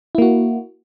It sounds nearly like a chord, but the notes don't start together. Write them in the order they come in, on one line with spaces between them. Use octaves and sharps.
E4 A#3 F#4